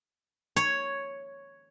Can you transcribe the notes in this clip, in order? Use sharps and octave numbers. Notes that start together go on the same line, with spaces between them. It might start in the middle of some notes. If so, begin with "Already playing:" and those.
C#5